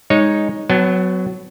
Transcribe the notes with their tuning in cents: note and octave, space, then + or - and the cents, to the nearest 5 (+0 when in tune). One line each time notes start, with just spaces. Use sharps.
G#3 -10 D#4 +0 C#5 +0
F#3 +0 B3 +35 A5 -15